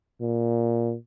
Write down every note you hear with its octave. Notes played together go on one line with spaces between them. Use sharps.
A#2